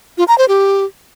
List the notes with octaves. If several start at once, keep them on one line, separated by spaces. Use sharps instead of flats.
F4
A#5
C5
G4